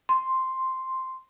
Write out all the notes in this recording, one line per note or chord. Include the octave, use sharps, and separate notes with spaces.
C6